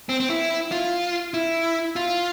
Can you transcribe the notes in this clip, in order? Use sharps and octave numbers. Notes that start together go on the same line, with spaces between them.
C4
C4
E4
F4
E4
F4